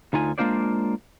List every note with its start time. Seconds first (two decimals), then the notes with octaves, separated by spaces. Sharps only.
0.13 D2 D#4 F4 G#5
0.38 G#3 A#3 D4 F4 C5 D5